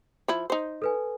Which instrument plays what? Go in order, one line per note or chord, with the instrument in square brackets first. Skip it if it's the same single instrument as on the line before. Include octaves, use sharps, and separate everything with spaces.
[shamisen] F3 E4
D#4 C5
[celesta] A4 B4 G#5